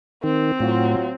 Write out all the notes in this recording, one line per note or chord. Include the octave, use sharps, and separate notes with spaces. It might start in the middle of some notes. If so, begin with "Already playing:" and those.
D#3 C4
A2 F#3 F4